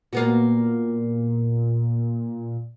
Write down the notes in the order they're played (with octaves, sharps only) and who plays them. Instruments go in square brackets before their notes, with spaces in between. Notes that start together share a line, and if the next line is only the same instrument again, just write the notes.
[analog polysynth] A#2 [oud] A#3 B3 F#4